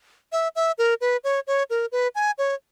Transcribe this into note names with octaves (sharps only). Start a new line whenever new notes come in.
E5
E5
A#4
B4
C#5
C#5
A#4
B4
G#5
C#5